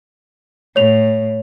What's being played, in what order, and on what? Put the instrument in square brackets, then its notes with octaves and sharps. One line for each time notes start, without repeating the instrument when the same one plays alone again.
[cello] A2 [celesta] C#5 F7